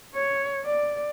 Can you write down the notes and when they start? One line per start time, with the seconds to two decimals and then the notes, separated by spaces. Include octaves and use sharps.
0.14 C#5
0.64 D5